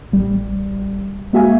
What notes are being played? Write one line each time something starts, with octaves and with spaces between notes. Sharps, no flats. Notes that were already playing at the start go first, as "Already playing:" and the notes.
A1 G3
G#3 A#3 F#4 E5 F5 G#5